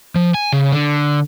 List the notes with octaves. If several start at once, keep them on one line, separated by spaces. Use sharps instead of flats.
F3
G#5
C#3
D3